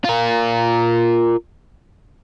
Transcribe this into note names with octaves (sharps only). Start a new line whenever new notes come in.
F4 A#4